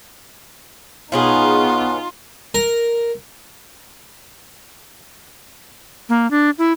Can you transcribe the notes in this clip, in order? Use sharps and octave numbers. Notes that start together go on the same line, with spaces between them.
B2 B3 C#4 D#4 F4 G#4
A#4
A#3
D4
E4